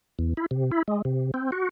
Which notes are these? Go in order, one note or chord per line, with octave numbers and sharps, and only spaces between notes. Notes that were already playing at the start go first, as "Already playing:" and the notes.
E2
E4
C3
E4
G#3
C3
C4
F#4